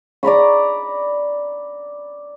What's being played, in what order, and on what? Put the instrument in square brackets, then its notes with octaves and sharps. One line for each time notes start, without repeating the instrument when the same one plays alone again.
[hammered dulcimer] D5 A#5 B5 C#6